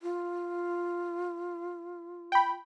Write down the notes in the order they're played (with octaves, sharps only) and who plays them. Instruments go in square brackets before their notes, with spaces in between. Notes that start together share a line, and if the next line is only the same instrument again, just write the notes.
[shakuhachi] F4
[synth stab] G5 B5